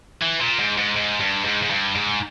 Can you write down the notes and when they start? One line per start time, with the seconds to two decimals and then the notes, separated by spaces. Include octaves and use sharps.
0.21 E3
0.40 A#2
0.59 G#2
0.77 G#2
0.96 G#2
1.21 G2
1.45 G#2
1.63 G#2
1.70 G2
1.96 G#2